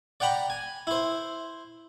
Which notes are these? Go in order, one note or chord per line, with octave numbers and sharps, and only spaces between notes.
D5 F#5 G5 A#5 B5
G#5
E4 C5